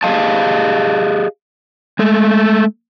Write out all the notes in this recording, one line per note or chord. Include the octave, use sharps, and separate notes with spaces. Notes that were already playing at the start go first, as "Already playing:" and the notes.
G4 G#4 C#5 D#5 F5 A5
G#3 A3